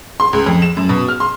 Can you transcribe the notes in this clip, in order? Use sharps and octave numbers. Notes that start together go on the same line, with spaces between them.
C6
C#2
F2
E7
F#2
B2
F6
C6